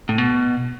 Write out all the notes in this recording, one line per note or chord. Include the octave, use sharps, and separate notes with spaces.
A2
B2